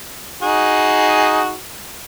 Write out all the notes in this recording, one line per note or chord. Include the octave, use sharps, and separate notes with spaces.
D#4 F#4 G#4